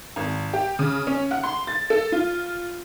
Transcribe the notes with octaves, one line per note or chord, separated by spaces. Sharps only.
G#1
G4
C#3
C#4
F#5
C6
A6
A4
F4